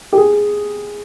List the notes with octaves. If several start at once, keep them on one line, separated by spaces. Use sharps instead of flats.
G4
G#4